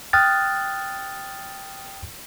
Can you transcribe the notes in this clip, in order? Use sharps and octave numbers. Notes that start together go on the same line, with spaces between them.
G5 D#6 F6 F#6 A6